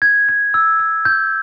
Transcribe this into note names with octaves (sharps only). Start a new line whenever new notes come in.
G#6
G#6
E6
E6
G6